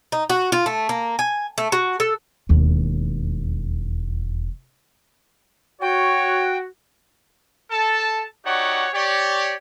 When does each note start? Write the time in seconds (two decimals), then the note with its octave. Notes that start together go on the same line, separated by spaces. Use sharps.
0.12 D#4
0.30 F#4
0.52 F4
0.66 A3
0.89 A#3
1.19 G#5
1.58 A3
1.72 F#4
2.00 A4
2.49 E1 D#2
5.82 F#4 C#5 G5
7.71 A4 A5
8.45 D#4 F#4 G4 C#5 D5 F#5
8.93 G4 C#5 D5